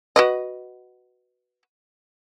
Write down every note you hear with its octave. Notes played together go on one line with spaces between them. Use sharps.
F#4 B4 D#5